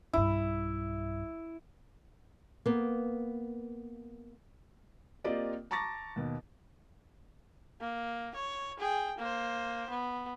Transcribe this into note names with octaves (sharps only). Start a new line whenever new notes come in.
B1 G2 E4
A#3 B3
A#3 C4 F4 G4 D5 D#5
A5 A#5 C#6 D6 A6 A#6
D#2 B2
A#3
C#5
G#4 G5
A#3 C5
B3